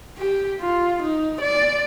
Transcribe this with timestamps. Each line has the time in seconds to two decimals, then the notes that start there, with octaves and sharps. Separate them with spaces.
0.18 G4
0.60 F4
1.02 D#4
1.41 D5